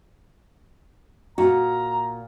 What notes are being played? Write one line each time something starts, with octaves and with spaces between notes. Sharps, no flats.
A#2 F#4 A#5